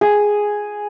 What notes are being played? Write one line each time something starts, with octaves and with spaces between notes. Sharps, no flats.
G#4